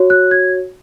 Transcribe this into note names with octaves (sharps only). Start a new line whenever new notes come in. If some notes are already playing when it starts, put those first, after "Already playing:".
Already playing: F#4 C#5
F#6
G#6